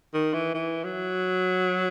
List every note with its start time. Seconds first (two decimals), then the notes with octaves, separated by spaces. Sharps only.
0.14 D#3
0.34 E3
0.54 E3
0.84 F#3